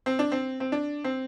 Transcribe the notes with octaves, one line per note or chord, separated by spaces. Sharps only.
C4
D4
C4
C4
D4
C4